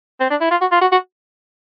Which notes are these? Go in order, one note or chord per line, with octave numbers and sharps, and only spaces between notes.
C4
D4
E4
F4
F#4
F4
F#4
F#4